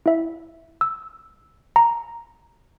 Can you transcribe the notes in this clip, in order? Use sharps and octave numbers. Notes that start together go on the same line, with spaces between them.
E4 E5
E6
A#5